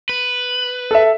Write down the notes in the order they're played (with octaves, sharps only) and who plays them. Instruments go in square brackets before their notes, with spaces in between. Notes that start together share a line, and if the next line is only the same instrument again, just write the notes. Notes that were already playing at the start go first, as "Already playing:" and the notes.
[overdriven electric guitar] B4
[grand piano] A4 E5